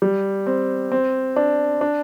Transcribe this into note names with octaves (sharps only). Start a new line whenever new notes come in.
G3
C4
C4
D4
D4